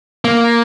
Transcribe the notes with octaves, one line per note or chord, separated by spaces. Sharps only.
A#3